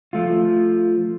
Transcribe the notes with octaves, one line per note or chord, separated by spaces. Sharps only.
F3 A3 F4